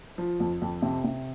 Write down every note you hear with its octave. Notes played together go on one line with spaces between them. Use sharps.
F3
F2
F2
C3
C3